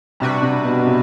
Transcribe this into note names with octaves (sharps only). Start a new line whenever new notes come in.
C3 G3 D4 F#4 B4
C3
B2
B2
C3